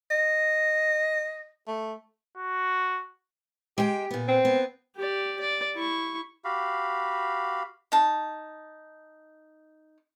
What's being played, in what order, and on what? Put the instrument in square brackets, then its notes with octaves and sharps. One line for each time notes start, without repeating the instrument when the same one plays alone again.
[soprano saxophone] D#5
A3
[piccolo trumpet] F#4
[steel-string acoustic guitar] G#3 G5 [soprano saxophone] G4
[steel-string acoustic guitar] A#2 B3
[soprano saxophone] C4
[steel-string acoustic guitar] B3
[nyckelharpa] G4 D5
D5
E4 C#6
[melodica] F#4 G4 F5 B5
[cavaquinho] D#4 A5